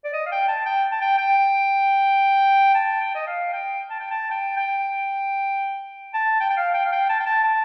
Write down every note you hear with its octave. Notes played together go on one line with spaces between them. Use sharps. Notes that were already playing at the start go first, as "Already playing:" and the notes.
D5
D#5
F5
G5
A5
G5
A5
G5
G5
A5
G5
D#5
F5
G5
A5
G5
A5
G5
G5
A5
G5
G5
F5
G5
F5
G5
A5
G5
A5
A5